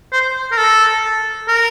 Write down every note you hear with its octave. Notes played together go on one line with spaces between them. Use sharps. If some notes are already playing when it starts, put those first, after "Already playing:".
C5
A#4
A4
A#4